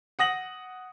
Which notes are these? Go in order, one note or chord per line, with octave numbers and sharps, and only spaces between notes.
F#5 D#6 A#6 F#7